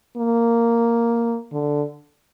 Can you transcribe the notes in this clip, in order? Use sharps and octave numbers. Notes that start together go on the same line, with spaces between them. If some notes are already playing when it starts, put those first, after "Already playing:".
A#3
D3